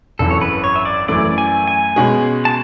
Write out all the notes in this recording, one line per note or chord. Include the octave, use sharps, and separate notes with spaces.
G#1 F#2 E3 A4
C#5
B4
C#5
E5
D5
F#2 E3 A3 D5
G#5
G#5
B2 G#3 C#4 G#4
A5